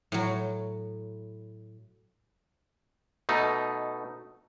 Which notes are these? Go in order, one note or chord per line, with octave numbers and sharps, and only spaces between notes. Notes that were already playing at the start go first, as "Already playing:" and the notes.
A2 F#3
B2 A3 D#4